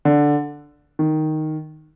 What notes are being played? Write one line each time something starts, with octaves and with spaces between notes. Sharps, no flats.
D3
D#3